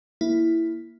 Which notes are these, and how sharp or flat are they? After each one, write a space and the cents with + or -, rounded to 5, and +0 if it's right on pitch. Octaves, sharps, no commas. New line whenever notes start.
A#3 +0 E4 +0